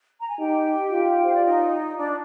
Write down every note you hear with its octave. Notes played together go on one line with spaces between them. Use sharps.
A#5
G#5
D#4 G4 G5
F4
C5
D5
D#4 D#5
D4 D5